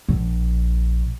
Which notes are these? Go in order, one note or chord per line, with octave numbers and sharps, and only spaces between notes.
A#1